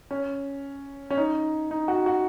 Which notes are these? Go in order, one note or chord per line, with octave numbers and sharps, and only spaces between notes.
C#4
C#4
D#4
D#4
F#4
F#4